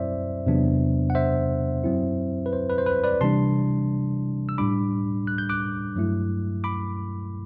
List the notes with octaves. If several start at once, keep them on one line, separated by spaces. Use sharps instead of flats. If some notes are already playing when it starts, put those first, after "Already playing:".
Already playing: F#2 F#3 C4 E4 C5 D5 E5
E2 C3 F#3 B3 D4
F#5
C5 E5
F#2 F#3 C4 E4
B4
C5
B4
C5
B4
B4 D5
C3 E3 G3 D4 A5 C6
E6
A2 G3 D4 B5 D6
F#6
G6
D6 F#6
G2 F#3 A3 E4
B5 D6